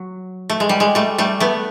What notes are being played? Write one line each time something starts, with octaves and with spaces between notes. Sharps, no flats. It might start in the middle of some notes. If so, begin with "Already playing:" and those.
Already playing: F#3
A3
G#3
G3
G#3
G3 A3
G3 A3
A3 B3